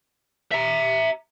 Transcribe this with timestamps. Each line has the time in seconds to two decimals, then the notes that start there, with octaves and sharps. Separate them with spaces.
0.52 E5 A#5